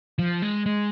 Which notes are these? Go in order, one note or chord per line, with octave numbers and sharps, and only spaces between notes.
F3
G#3
G#3